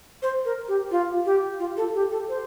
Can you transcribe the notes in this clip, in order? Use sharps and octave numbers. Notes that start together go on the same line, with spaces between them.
C5
A#4
G4
F4
G4
F4
A4
G4
A4
C5